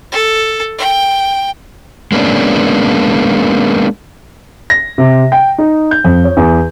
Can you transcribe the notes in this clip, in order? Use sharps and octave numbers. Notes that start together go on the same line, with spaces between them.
A4
G5
G#3 A#3 B3 C#4 D4
A#6
C3
G5
D#4
G6
F2
C#5
E2